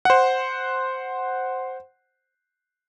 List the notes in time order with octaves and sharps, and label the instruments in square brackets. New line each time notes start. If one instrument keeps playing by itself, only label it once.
[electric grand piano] C5 F#5